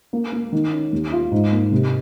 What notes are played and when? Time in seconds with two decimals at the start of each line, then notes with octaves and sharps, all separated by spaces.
0.13 A#3
0.32 A#3
0.52 D#3
0.72 C#4
0.92 D#2
1.12 F4
1.31 G#2
1.52 A#3
1.72 C3